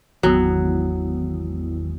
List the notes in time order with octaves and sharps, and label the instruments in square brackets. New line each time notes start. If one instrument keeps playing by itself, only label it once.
[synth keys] G#1 E2 [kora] F#3